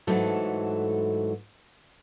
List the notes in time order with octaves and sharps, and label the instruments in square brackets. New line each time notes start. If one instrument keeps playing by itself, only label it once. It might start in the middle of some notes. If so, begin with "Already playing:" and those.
[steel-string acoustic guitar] G#2 E3 F#3 A3 A4